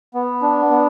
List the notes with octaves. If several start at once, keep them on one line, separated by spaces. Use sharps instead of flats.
B3
D4
B3